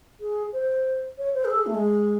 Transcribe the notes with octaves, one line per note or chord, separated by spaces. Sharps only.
G#4
C5
C#5
C5
G#4
A4
G#4
A3
G#3